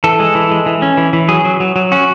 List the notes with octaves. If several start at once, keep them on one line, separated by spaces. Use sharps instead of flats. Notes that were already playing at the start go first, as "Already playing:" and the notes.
E3 A4
G#3
E3
G#3
E3
C#4
E3
E3
F#3 G#4
F#3
F#3
F#3
C#4 F#4